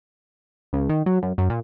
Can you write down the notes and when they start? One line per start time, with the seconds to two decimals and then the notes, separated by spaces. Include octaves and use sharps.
0.73 C#2
0.89 D#3
1.06 F#3
1.23 F#2
1.38 F#2
1.50 A#2